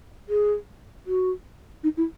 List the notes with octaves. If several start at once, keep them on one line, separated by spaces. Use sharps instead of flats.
G#4
F#4
D#4
E4